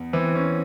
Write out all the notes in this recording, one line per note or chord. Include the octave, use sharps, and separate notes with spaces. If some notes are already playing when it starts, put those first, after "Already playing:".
Already playing: E2
E3 C4
C#4